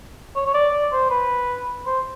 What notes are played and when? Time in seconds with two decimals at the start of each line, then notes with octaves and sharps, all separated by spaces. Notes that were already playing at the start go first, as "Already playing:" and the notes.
0.36 C#5
0.47 C#5
0.54 D5
0.73 D5
0.92 C5
1.10 B4
1.86 C5